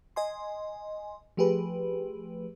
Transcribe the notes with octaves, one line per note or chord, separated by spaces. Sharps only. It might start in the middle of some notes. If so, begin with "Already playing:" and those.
D#5 G#5 C6
F3 A3 G4 G#4 B4